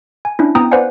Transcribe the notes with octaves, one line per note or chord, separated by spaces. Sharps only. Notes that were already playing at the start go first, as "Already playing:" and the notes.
G#5
C#4 D4 E4
B3 C4 E4 G5 A#5 D#6
B4 C5 D5 F5 F#5 G#5